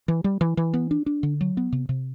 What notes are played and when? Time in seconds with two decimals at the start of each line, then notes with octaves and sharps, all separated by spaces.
0.08 E3
0.24 G3
0.41 E3
0.57 E3
0.74 B3
0.91 D4
1.06 D4
1.23 D3
1.41 F#3
1.57 B3
1.72 C3
1.89 C3